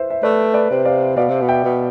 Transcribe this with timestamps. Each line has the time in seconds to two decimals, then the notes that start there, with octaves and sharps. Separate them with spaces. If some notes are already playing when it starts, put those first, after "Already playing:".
Already playing: E4 B4 C5 E5
0.10 E5
0.23 A3 B4 D5
0.54 B4 D5
0.71 C3
0.85 D5 F5
1.17 B2 D5 F5
1.29 C3
1.41 B2
1.48 E5 G5
1.64 B2